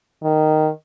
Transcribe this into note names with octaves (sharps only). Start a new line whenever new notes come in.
D#3